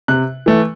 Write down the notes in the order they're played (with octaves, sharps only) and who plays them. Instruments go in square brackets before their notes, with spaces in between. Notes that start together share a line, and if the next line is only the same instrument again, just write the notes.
[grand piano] C3 F#6
E3 A3